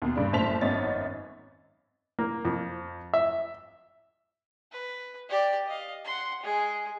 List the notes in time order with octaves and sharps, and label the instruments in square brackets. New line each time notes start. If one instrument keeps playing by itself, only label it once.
[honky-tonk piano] D#2 B2
G2 C#3 D4
F#1 A2 C5 A5 B6 F7
G#1 F#2 B3 D#4 C#5 A6
[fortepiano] A#3
F2
E5
[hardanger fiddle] B4
G4 D5
D#5 F5
F#5 C6
G#3 G#4